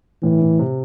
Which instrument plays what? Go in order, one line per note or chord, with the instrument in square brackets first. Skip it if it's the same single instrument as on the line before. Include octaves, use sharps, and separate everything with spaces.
[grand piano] A2 [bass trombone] E3
[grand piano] A2
C3